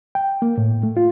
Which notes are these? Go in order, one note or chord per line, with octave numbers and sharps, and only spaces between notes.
G5
A#3
A2
A3
F4